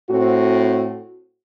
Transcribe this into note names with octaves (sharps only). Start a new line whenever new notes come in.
A2 C4 F#4